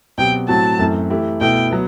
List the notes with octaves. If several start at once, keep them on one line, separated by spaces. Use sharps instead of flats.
B2 F#3 C4 G4 G5
A2 F#3 C4 F#4 A5
F#2 E3 A3 C4
E3 A3 E4 G4
B2 A3 E4 G5
F#3 B3